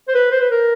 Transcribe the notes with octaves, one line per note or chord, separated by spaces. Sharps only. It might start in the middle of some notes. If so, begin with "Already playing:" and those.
C5
B4
C5
B4
A#4